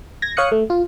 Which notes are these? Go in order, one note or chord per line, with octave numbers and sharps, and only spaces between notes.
G#6 A#6
C#5 F5 D#6 F#6 C#7
A3
F4